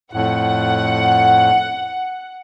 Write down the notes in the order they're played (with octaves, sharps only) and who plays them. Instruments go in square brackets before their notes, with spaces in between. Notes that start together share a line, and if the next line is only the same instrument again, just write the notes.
[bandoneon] F2 A2 [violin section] F#5